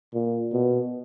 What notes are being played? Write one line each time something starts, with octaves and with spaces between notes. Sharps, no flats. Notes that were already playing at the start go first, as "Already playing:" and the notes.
A#2
B2